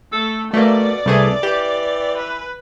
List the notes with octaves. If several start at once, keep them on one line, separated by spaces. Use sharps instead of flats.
A3 A4
B2 A3 A#3 D5
C2 E3 A3 G#4
E3 G4
B4